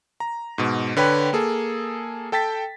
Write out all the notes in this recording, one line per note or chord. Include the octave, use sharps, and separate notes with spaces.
A#5
G#2 B2
D3 B4 C#5 G5 B5
A#3 G#4 A4
A4 G5 A5 A6 B6